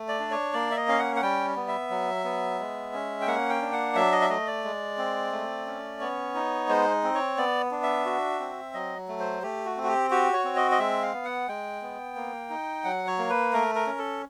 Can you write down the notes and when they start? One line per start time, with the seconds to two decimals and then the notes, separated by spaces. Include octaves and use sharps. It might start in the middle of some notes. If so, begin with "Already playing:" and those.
Already playing: A3
0.08 D5
0.20 D4
0.31 C#5
0.53 A#3 D5
0.71 E5
0.77 D#5
0.88 C#4 F5
0.99 F#5
1.16 F#5
1.22 G3 G5
1.56 B3
1.68 E5
1.90 F#3
2.24 B3
2.59 G#3
2.93 C#4
3.21 G5
3.27 A#3 F#5
3.50 G5
3.61 D4
3.73 F#5
3.95 F#3 E5
4.12 D#5
4.21 E5
4.30 A3 D#5
4.47 D5
4.64 G#3
4.98 C4
5.32 A3
5.66 C#4
6.00 B3 C#5
6.35 D#4
6.69 G#3 C5
7.03 C4
7.15 C#5
7.37 B3 D5
7.71 D4
7.83 E5
8.05 F#4
8.40 C4
8.74 F#3 D#5
9.08 A3
9.20 C5
9.43 A3 G4
9.65 F#4
9.77 C4
9.83 F#4
9.88 G4
10.11 F#4 G4
10.33 C#5
10.45 C4
10.56 D#5
10.71 D#5
10.79 G#3 E5
11.02 F5
11.13 B3
11.25 F#5
11.48 G#3 G5
11.82 B3
12.16 A#3
12.50 D#4
12.84 F#3 F#5
13.07 C#5
13.19 A#3
13.30 B4
13.53 A3 A#4
13.75 A#4
13.87 C#4
13.98 A4